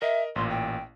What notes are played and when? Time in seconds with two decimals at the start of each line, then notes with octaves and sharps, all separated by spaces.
0.02 A#4 D#5 E5
0.36 A1 A#2 C6
0.50 G5